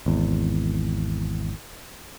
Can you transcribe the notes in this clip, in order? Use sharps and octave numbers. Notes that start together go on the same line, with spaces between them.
G#1 E2